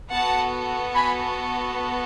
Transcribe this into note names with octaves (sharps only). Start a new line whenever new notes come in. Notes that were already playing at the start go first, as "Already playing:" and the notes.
B3 F#4 A4 F#5 A5
G#5 B5